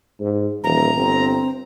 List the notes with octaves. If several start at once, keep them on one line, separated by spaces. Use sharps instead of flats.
G#2
D#1 E3 A#5
G1 C4